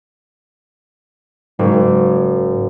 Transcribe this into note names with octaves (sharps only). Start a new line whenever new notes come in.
F#1 G#2